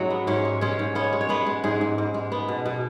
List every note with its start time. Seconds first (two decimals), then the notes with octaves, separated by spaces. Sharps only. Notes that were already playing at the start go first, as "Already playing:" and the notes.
Already playing: G#2 F#3 G#3 C#4 F#4
0.10 B3
0.27 G#2 C#4 C#5
0.45 G#3
0.61 G#3 C#4 C#5
0.79 G#2
0.95 B3 C#4 C#5
1.13 G#3
1.21 C#5
1.29 G#3 B3 B4
1.46 G#3
1.64 G#2 G#3 G#4
1.81 G#2
1.98 G#2
2.14 G#3
2.32 B3
2.48 B2
2.66 B2